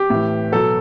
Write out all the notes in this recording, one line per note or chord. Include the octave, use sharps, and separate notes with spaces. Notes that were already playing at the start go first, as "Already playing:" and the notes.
Already playing: G4
A2 E3
B2 F#3 A4